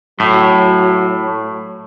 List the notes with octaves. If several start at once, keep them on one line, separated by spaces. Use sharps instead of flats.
A2 F#3